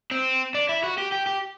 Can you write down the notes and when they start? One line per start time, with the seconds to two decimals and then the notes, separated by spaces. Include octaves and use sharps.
0.11 C4
0.55 D4
0.69 E4
0.83 F#4
0.98 G4
1.12 G4
1.26 G4